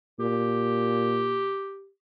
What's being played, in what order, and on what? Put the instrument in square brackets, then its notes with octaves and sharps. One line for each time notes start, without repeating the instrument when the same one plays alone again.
[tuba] A#2 [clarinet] G4